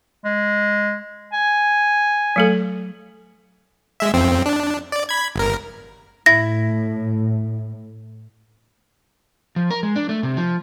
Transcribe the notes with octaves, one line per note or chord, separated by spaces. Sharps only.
G#3
G#5
F#3 A3 A4
G#3 E5
F2 C4
D4
D5
B5 G#6
G1 A#4
A2 E4 A#6
F3
A#4
G#3
D4
A3
C3
F3